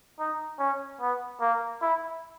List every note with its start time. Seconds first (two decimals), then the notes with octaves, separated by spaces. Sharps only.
0.19 D#4
0.59 C#4
1.01 B3
1.40 A#3
1.82 E4